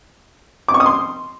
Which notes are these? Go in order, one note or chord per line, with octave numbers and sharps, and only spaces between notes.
D6
C#6
D#6
C6